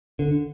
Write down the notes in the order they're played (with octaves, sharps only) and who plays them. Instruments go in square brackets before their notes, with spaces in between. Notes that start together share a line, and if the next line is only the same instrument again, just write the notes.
[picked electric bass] D3